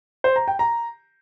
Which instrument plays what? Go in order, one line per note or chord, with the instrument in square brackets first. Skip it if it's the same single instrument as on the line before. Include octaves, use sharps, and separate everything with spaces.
[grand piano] C5
A#5
G5
A#5